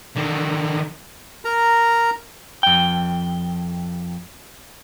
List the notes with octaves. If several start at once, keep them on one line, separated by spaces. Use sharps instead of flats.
D3 D#3
A#4 A#5
F2 G5